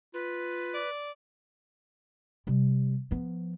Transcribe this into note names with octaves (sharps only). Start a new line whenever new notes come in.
F4 B4
D5
C3 G3
F3 B3